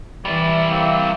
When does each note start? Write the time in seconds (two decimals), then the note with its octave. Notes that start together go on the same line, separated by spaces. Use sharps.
0.25 E3 G3 E4 D5 E5
0.70 A#3 C4